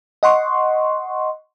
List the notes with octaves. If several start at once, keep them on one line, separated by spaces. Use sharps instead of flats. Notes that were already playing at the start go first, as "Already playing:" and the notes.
D#5 F#5 C6 C#6